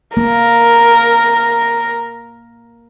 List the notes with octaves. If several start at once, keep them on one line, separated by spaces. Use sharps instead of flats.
A#3 A#4